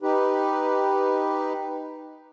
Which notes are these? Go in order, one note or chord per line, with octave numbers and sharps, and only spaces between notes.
D#4 G4 B4